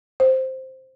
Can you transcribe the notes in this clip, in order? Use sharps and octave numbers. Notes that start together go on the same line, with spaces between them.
C5